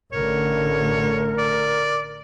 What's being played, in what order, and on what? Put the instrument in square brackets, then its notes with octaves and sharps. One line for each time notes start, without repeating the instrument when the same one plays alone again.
[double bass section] A1 D3 A3 [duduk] A#4 [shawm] C#5
[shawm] D5